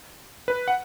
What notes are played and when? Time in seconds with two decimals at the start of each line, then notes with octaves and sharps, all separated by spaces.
0.48 B4
0.68 F#5